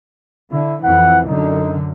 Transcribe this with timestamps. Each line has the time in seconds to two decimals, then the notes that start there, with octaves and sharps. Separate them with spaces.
0.52 D3 E4
0.84 F2 E3 F#5
1.27 F#2 D3 D#4